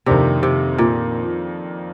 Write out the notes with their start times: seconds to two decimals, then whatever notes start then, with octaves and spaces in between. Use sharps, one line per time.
0.06 F2 C3 D#3 A#3 D4 G4
0.43 C3
0.78 A#2